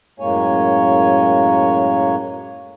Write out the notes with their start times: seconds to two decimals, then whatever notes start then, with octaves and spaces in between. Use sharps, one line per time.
0.19 F#2 A2 G#3 A#3 C#5 G#5